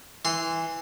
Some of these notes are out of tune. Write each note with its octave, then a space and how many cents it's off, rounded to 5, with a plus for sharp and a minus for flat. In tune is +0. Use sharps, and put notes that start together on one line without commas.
E3 -5 C6 -15